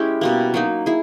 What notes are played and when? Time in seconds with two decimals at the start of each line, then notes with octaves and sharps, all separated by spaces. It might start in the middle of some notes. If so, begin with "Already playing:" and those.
Already playing: G#3 C#4 E4 G4
0.21 B2 G3 A#3
0.54 F#3 A#3 D#4
0.86 E4 G#4